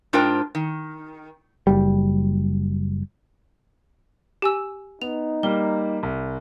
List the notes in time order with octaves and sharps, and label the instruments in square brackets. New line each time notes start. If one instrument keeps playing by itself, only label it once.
[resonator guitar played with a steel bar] G#2 D4 F4 A#4 C5 G5
D#3
[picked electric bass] F#1 G3
[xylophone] G4 G#5 E6
[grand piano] B3 [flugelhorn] D#4 [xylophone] F7
[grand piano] G3 A#3 [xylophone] G7
[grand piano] C2